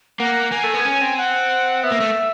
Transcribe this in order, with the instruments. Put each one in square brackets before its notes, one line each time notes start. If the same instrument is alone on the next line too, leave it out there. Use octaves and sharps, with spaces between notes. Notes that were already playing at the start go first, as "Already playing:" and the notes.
[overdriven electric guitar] A#3 [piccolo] F#5
[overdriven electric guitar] A#3 [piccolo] G#5
[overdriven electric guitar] A3
B3
C#4
C4
[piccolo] F#5
[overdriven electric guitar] B3 [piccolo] E5
[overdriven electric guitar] A#3
A3